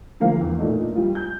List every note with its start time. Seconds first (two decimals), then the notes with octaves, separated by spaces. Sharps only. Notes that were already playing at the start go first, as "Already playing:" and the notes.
0.20 D3 F3 A#3 F5
0.38 E2 E3
0.58 A#2 A3 D4 D#4
0.95 G3 F4
1.15 G6